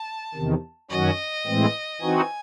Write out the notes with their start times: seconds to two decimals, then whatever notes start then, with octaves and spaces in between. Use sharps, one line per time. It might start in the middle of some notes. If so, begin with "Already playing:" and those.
Already playing: A5
0.34 E2 C3 D#3
0.90 F#2 D#3 F#3 C#4 F#4 D#5
1.46 A2 E3 G#3 C4
2.01 E3 C4 D#4 F#4 G#5